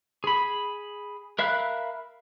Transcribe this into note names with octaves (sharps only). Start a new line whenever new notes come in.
G#4 B5
A#4 E5 F5 B5 F#6